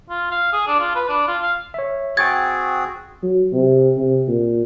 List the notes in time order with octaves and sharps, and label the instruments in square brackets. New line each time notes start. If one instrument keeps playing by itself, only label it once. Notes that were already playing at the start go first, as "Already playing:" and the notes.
[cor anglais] F4
F5
G#4
D4
F4
B4
D4
F4
F5
[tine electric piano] C#5 E5
[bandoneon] C4 F#4 G#4 [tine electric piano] G5 C#6 A6 [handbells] G#6
[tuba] F#3
C3
C3
A#2